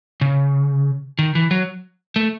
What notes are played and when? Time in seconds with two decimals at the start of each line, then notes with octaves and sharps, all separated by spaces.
0.21 C#3
1.19 D#3
1.35 E3
1.51 F#3
2.16 A3